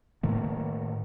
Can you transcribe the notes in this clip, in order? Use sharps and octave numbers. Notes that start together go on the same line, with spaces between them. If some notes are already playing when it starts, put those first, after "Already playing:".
A2 D#3 A#3